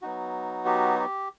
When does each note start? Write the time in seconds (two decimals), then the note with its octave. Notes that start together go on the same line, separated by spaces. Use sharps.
0.02 F#3 B3 D#4 F#4
0.66 G4
0.99 G4